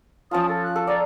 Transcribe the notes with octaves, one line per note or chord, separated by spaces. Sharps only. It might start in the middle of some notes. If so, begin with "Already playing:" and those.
F3 C#4 F4 A5 D#6
A4
F#6
A4
A4 D5 A#5